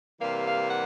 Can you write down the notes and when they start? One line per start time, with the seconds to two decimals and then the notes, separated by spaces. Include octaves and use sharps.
0.20 C3 E3 G3 A#3 F5
0.45 F5
0.69 F#5